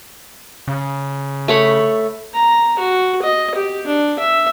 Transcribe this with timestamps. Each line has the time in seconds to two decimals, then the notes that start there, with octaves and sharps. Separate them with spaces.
0.68 C#3
1.48 A3 C#5 B5
2.34 A#5
2.79 F#4
3.22 D#5
3.55 G4
3.87 D4
4.19 E5